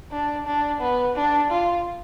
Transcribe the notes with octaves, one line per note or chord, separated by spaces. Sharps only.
D4
D4
B3
D4
F4